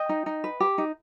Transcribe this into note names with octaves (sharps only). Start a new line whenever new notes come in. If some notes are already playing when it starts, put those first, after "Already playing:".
Already playing: D#5 G5
D#4
D#4
B4
G4
D#4